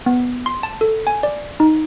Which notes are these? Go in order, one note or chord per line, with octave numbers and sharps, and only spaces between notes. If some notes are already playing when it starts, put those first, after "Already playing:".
B3
C6
A5
A4
G#5
D5
D#4